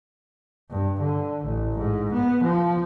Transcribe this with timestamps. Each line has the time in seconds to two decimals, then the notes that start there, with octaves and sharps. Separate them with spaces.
0.71 G2
1.01 D3
1.45 A1
1.79 G#2
2.13 B3
2.44 F3